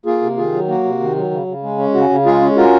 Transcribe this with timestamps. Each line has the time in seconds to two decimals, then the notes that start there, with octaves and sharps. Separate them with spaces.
0.06 A#3 F4 G#4
0.21 C3
0.37 D#3 F4 G#4
0.52 F#3
0.68 A#3 F#4
0.84 C3
1.00 D#3
1.16 F#3
1.31 C#3
1.47 C#3
1.63 G#3
1.78 C#4
1.94 C#3 F#4
2.10 C#3
2.26 G#3 F4 G#4
2.41 C#4
2.57 F4 F#4 A#4